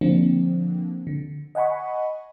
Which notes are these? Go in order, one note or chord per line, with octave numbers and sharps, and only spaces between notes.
D3 F3 A#3 C4 D4
D3
D#5 F#5 G#5 B5 C#6